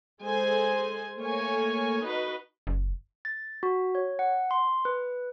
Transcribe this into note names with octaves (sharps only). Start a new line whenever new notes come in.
G#3 G#4 A4 C5 G#5
A3 A#3 C#5 G#5
D#4 F#4 B4 D#5
F#1
A6
F#4
C#5
F#5
C6
B4